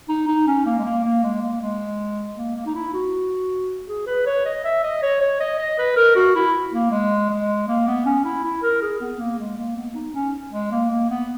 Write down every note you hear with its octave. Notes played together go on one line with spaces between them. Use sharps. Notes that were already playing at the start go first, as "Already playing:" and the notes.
D#4
D#4
C#4
A#3
G#3
A#3
A#3
G#3
A#3
G#3
A#3
A#3
D#4
E4
F#4
G#4
B4
C#5
D#5
E5
D#5
C#5
C#5
D#5
D#5
B4
A#4
F#4
E4
A#3
G#3
G#3
A#3
B3
C#4
E4
E4
A#4
G#4
B3
A#3
G#3
A#3
B3
D#4
C#4
G#3
A#3
A#3
B3